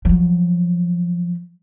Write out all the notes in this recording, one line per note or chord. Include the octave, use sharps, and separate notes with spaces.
F3 F#3